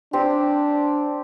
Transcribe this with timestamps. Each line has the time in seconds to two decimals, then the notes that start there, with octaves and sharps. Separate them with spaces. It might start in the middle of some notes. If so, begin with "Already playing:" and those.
0.13 C4 D4 G4